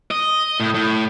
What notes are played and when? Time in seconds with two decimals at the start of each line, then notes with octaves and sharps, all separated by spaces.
0.11 D#5
0.60 A2
0.75 A2